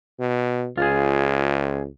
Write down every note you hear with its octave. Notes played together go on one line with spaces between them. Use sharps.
B2
C#2 F4 G#4